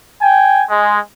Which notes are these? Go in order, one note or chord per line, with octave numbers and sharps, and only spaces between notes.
G5 G#5
G#3